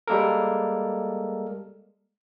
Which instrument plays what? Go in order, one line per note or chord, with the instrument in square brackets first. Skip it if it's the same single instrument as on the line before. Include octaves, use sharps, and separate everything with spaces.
[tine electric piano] G3 G#3 A#3 A4 A#4